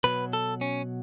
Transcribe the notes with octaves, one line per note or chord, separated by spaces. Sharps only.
B2 F#3 B4
A4
C#4